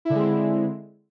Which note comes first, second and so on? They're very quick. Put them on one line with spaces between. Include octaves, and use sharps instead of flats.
E4 D3 G#3 C4